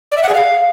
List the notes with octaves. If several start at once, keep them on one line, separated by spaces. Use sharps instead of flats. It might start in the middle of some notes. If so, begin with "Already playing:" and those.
D5
E5
F#5
G#4
F5